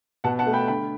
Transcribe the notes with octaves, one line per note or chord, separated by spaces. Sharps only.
B2 F#5 A5
F#5 A5
A3
G5 B5
D3 G5 B5